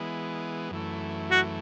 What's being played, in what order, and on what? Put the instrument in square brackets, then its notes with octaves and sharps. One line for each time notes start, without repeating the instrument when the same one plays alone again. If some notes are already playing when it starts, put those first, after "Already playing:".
Already playing: [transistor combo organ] E3 G#3 B3
F#2 E3 A3
[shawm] F#4